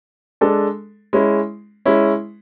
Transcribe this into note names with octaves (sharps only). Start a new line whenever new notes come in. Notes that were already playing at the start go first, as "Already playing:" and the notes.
G#3 D4 A4
G#3 C#4 E4
G#3 C#4 E4